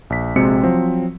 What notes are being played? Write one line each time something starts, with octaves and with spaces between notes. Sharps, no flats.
A#1 B6
A#1 C3 G#3 C4 F#4 C#7
F3 F#3 C4